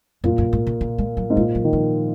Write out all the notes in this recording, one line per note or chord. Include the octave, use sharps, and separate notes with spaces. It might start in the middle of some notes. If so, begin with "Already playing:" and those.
F#2 A#2
F#2
G#2
C#3
C#3
G#3
F#3
G#2
A#2 G#3
F#3
D#3
F3